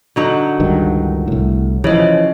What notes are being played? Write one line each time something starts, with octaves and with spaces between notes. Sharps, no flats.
D3 F#3 D#4
C#2 G2 D#3
C2 A2
C#3 E3 F3 C#5 D#5